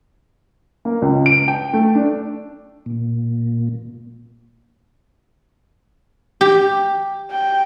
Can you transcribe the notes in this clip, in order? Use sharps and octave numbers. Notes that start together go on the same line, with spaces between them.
A#3
C#2
D7
G5
A3
D4
A#2
G4
G5